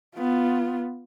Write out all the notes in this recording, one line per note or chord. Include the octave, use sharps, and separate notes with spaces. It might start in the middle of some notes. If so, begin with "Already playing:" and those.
B3 F4